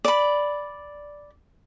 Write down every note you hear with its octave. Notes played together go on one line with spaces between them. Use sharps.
D5 B5